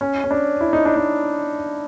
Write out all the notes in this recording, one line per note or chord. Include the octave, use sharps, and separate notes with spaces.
C#4
C#4
D4
E4
D#4
D4
D#4